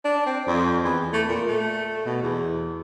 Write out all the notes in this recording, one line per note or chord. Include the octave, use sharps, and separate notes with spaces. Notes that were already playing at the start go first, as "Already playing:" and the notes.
D4
C4
F2
E2
A3
A#2
A3
B2
E2